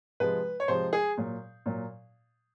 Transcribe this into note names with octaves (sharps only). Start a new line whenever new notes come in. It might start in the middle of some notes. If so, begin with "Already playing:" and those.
C3 F3 G#3 B4
C#5
C3 F3 G#3 C5
G#4
A#2 F#3
A#2 F#3